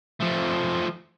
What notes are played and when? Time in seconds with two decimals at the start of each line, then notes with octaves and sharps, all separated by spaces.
0.21 F3 A3